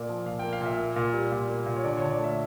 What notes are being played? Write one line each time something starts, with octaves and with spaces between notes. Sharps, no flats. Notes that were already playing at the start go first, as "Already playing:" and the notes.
Already playing: A#2 A#3 D5
F3
A#2 F5
A#3 G5
F5
A#2 E5
A#3
A#2
G3
A#2
A#3
A#2
C#5
D3 D5
D3 C#5
D5
A3 E5